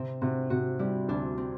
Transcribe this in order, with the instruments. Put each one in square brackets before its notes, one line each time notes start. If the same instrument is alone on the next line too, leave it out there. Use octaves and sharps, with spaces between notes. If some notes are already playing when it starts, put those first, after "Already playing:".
Already playing: [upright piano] C3 [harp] C4
[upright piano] C3 [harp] F#4
[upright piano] C3 [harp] F#4
[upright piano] G3 [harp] E4
[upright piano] D2 [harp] D4
[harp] C4